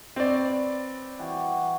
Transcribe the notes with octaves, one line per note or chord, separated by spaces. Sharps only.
C4 B4 C#5 D5
E3 G3 F#4